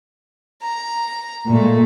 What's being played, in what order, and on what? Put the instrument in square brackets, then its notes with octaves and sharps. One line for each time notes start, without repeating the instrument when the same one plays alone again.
[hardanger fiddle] A#5
[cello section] A#2 G#3 [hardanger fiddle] A3